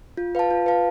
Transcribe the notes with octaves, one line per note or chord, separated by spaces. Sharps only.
F4
B4 F5 A5
F4
B4 F5 A5